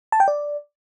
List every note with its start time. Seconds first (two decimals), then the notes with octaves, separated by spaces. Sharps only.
0.12 A5
0.20 G5
0.28 D5